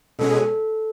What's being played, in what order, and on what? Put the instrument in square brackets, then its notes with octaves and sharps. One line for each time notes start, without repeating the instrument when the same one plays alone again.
[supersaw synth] B2 G#3 C#4 G#4 [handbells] A4